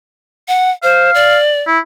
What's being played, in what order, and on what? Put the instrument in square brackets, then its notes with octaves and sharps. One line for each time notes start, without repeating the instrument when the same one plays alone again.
[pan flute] F#5
[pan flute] C5 [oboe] F5
[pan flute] D5
[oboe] E4